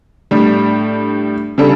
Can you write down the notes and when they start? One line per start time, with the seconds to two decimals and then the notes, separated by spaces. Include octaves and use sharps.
0.31 A2 G3 D4
1.58 C#3 G3 D4 A4